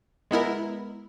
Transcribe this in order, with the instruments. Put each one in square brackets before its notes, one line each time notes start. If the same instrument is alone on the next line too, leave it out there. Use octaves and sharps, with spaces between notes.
[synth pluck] G#3 B3 E4 A#4